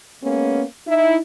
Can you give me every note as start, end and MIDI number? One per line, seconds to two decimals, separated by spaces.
0.24 0.64 56
0.24 0.64 58
0.24 0.64 59
0.24 0.64 61
0.88 1.17 63
0.88 1.17 64